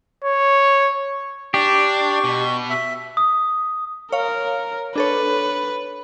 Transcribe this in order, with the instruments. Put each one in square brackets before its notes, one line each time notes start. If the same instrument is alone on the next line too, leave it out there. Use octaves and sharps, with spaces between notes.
[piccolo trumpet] C#5
[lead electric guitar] D4 [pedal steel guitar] G4 [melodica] C#6
[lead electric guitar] B2
[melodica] E5
[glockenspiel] D#6
[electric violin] A#4 [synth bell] C#5 F5
[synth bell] D4 A4 C#5 [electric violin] B4